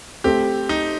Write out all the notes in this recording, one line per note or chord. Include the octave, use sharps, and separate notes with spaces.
A3 C4 G4
D#4